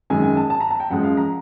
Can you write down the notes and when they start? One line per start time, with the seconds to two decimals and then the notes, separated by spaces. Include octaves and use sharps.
0.10 F#2 D#3 G#3 G#5
0.24 G#5
0.37 A5
0.50 A5
0.60 A#5
0.71 A5
0.80 G5
0.90 F#2 C#3 F3 G#3 F#5
1.04 F5
1.17 A#5